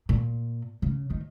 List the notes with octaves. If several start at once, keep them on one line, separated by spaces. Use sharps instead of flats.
A#2
C#3
D#3